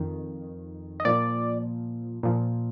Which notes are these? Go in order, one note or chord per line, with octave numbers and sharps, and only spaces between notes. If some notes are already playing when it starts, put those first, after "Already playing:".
Already playing: F2 D#3
D#5
A#2 F3 D5
A#2 F3